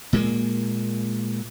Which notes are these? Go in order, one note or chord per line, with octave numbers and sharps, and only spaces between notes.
A#2 G#3 A#3